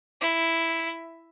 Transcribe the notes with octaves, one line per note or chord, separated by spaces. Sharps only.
E4